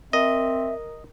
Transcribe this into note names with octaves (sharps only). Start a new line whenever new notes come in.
C4 A#4 D#5 E5